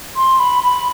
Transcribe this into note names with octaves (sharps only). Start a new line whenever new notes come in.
C6
B5
B5